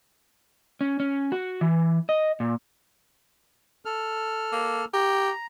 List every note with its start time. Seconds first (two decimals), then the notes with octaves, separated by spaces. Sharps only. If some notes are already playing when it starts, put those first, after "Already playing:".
0.81 C#4
1.00 C#4
1.32 F#4
1.61 E3
2.09 D#5
2.40 A#2
3.85 A4 F6
4.52 A#3
4.94 G4 A#5